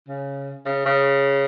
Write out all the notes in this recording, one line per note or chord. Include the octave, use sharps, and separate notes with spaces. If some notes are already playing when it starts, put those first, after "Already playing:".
C#3
C#3
C#3